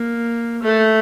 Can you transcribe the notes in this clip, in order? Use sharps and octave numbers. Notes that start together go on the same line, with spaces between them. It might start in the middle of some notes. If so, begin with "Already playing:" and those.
Already playing: A#3
A3